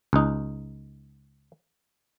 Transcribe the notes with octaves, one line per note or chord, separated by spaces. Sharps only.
C#2 D#4